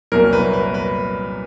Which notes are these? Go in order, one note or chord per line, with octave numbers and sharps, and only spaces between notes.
C2 A#2 F#3 A#4
B4
B4
B4